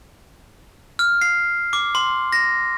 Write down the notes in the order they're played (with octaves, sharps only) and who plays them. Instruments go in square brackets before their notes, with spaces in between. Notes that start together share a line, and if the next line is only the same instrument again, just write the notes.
[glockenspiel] F6
C7
D6
C6
A#6